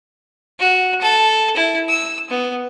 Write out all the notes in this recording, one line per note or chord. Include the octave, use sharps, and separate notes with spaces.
F#4
A4
E4
E6
B3